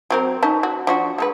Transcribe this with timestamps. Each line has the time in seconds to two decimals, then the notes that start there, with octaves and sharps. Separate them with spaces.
0.10 F#3 C4 A#4
0.43 C#4 D#4 A5
0.63 F#4
0.87 F3 D4 F#4
1.18 G#3 A4 B4